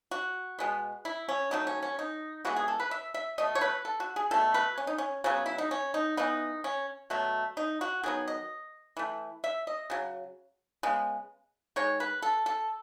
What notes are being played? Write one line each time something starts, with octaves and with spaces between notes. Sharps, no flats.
F#4
B2 G#3 B3
E4
C#4
D#3 F#3 A3 D#4
C#4
C#4
D#4
E3 G#3 B3 F#4
G#4
A4
B4
E5
E5
B2 A3 D#5
C#5
B4
A4
F#4
G#4
B2 A3 A4
B4
C#4
D#4
C#4
C#3 F#3 B3 C#4
E4
D#4
C#4
D#4
E3 B3 D#4
C#4
B2 F#3 A3
D#4
F#4
D#3 F#3 B3 G#4
D#5
E3 A3
E5
D#5
C#3 F#3
C#3 G#3 B3
D#3 G#3 C#5
B4
A4
A4